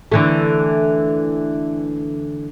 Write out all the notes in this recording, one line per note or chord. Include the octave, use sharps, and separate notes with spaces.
D3 E3 A3